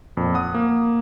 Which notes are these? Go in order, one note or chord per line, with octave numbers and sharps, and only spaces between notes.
F2 A#2
F#5 D#6
A#3